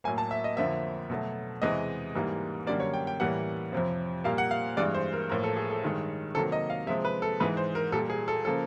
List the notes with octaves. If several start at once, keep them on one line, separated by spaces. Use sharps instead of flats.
A2 F#3 A#3 G#5
A5
E5
D#5
F2 D3 F3 A#3 E5
B2 F#3 A3
E2 C3 E3 G#3 D#5
G#2 E3 G3 A#3
F#2 D3 G3 A#3 D5
C#5
G5
G5
A2 E3 G3 A#3 F#5
F2 C3 F3
A#2 G3 A#3 F5
F#5
F5
G2 E3 G#3 D5
C5
A#4
A2 F3 A#3 A#4
A4
G#4
A4
G2 D#3 G#3
C3 D#3 F#3 A#3 A4
D#5
F5
C3 F3 G#3 E5
B4
A4
G#2 E3 G#3 B4
C5
A#4
A#2 G3 A#3 A4
G#4
A4
C#3 F3 A#3 A4